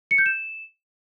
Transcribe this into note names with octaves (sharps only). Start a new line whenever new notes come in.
C#7
G6
E7